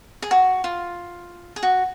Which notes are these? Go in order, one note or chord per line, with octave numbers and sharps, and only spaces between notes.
G#4
F#4
F4
G#4
F#4